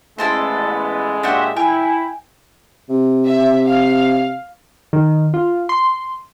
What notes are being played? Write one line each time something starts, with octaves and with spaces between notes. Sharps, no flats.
A1 G#3 A3 B3 E4 A4 C5
A#2 D4 F#4 G4 C5 E5
E4 G5 G#5
C3
E5
F5
D#3
F4
C6